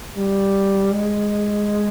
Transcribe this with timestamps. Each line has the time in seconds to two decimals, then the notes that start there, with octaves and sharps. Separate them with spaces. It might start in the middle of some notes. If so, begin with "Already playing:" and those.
0.16 G3
0.91 G#3